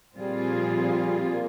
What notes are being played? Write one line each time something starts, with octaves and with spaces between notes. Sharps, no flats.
A#2 F3 G3 C4 F4 G#4
A#3